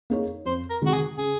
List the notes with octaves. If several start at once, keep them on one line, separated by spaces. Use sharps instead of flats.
A#3 D#4 G#4 C#5
F2 C5
A#4
C3 D#3 G#3 F#4
G#4
C#3 G#4